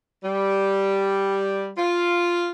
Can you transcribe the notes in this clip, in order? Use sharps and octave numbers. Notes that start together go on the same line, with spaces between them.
G3
F4